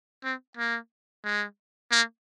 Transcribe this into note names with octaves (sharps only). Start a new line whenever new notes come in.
C4
A#3
G#3
A#3